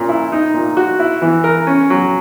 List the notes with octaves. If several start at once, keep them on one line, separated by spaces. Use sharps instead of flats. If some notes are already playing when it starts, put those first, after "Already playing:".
Already playing: A#2 C#4
E4
D#4
A#2
F#4
E4
E3
A#4
C#4
F#3